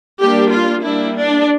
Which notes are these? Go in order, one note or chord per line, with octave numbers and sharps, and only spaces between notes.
G3 A#3 D4 G4
F4
G3 A#3 D4 E4
D4